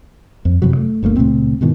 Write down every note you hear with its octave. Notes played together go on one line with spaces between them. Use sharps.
F2
F#2 C3 E3 F#3
A3
G1 D2 A3 A#3
C#2 A#2 A3 C4
G#2 B2 D#3 E3